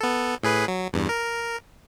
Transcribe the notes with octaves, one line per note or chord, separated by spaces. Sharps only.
B3 A4
A2 G#4 B4
F#3
E2 G2
A#4